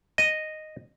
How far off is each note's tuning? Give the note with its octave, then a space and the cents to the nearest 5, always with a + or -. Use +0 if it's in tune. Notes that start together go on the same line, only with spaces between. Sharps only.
D#5 -5